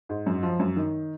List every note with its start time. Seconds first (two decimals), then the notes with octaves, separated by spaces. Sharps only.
0.09 G#2
0.26 F#2
0.43 F3
0.59 F#2
0.76 D#3